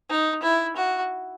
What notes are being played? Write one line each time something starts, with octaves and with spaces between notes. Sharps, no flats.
D#4
E4
F#4